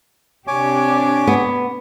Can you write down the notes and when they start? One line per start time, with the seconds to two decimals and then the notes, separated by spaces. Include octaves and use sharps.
0.47 C3 D4 G4 C#5 G#5 D6
1.27 B3